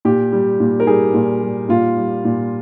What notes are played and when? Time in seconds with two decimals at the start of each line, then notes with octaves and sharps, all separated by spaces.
0.05 A#2 G4
0.32 G3
0.60 A#2
0.80 A#4
0.87 G3 G#4
1.14 A#2
1.42 G3
1.69 A#2 F4
1.97 G3
2.25 A#2